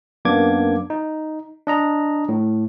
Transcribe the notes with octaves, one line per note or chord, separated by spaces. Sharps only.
F#2 A#3 B3 D4 D6 G#6
D#4
D4 D#5 A#5
A2